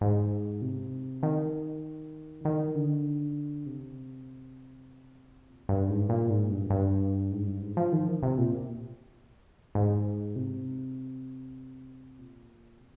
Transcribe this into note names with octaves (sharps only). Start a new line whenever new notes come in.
G#2
C3
D#3
D#3
D3
C3
A#2
G2
G#2
A#2
G#2
G2
G2
G#2
G2
G#2
F3
D#3
C3
A#2
G#2
C3
A#2
C3